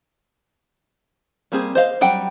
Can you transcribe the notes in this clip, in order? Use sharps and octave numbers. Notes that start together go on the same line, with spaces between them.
G3 A#3 C4 G#4
C5 D#5 F5
F#3 G3 F#5 G5